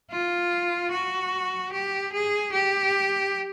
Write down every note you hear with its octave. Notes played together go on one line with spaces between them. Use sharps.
F4
F#4
G4
G#4
G4